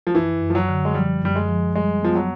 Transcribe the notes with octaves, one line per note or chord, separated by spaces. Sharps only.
F3
F#2 E3
F#2
F3
F#3
D3
G#3
F3 G3
F#2 G3
G#3
F3
G3 G#3
F3 B3
F#3